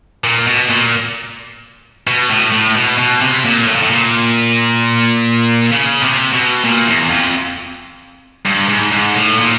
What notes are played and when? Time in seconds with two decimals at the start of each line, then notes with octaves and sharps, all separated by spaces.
0.24 A#2
0.47 B2
0.70 A#2
2.07 B2
2.30 A2
2.52 A2
2.76 B2
2.98 B2
3.21 C3
3.45 A#2
3.67 A2
3.75 A#2
3.82 A2
3.90 A#2
5.72 C#3
6.03 C3
6.33 B2
6.64 A#2
6.87 E2
7.09 F2
8.46 G2
8.69 G#2
8.92 G#2
9.15 A2
9.38 A#2